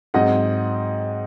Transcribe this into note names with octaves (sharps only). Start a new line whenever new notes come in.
G#2 F#3 C4 D#5 F#5